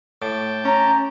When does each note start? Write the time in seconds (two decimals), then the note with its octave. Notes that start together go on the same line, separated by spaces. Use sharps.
0.22 A2 G5 A5 D6
0.65 C#4 A#5